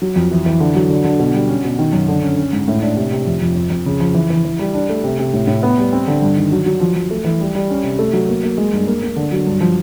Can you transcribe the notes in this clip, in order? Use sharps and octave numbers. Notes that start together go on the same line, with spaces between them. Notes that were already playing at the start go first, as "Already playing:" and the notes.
F#3
F2
E3
E3
D3
F#3
D3
D3
B2
G3
C#4
B2
D#3
F#2
D3
C#4
C#4
G#2
A2
D4
C3
C3
F2
F2
F2
F2
C#3
F3
E3
E3
E3
G3
D4
A3
C3
C3
A2
A2
B3
G3
C4
D3
G2
D#3
F#3
F#3
F3
F3
A3
E3
G3
G3
C#4
C3
A3
F#3
A#3
A#3
G#3
G2
A#3
A#3
D3
F#3
G2
F3